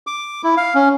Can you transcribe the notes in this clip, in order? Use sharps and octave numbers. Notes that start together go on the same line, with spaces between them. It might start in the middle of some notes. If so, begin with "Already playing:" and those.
D6
E4
F5
C#4